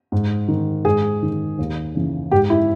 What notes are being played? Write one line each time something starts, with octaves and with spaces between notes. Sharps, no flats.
G#2
D#3
G#2 G#4
D#3
D#2
C#3 E3
G#2 G4
E4